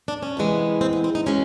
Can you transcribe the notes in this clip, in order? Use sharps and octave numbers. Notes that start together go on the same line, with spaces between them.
D4
C#4
E2 C3 E3 G#3 B3
C4
B3
C4
D#4
B2 G#3 C#4